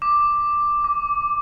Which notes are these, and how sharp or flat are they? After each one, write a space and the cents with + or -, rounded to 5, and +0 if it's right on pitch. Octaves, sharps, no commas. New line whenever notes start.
D6 +5
D6 -15